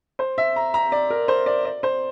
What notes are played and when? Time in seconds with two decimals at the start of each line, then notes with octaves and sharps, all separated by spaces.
0.19 C5
0.38 E5
0.56 A#5
0.74 A#5
0.92 D5
1.10 A#4
1.28 C5
1.46 D5
1.65 D5
1.83 C5